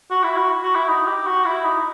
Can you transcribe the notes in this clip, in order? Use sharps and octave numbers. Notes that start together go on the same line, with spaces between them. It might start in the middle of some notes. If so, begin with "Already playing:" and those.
F#4
E4
F#4
F#4
E4
D#4
G4
F#4
E4
D#4